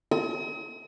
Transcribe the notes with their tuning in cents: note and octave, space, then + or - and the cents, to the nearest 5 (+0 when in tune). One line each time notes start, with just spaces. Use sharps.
D#6 +40